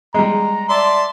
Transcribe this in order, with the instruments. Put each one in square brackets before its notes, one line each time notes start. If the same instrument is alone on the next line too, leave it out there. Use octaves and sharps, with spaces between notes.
[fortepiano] G3 G#3 [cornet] A#5
[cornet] D5 [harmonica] E5 A5 C6